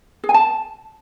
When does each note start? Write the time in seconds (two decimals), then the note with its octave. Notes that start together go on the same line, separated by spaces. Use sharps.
0.24 G#4
0.29 G#5
0.34 A5